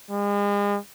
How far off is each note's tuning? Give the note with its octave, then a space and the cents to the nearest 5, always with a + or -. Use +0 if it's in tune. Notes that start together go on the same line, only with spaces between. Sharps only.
G#3 -40